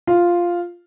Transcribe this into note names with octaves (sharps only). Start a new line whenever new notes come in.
F4